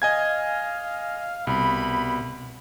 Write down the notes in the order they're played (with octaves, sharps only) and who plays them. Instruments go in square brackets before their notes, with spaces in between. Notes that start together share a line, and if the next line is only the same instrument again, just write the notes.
[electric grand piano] D#5 G#5 G#6 [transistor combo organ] F5
[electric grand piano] C2 [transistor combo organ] B2 [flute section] B5